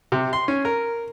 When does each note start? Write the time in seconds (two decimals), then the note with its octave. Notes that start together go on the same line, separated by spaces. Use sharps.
0.12 C3
0.33 C6
0.48 C#4
0.65 A#4